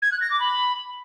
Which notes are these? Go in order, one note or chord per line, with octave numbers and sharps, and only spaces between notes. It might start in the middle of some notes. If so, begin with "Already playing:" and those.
G#6
F#6
A#6
D6
B5